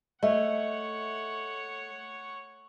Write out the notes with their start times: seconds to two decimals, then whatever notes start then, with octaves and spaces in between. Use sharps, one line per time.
0.23 A3 C#5 D#5 E5 F#5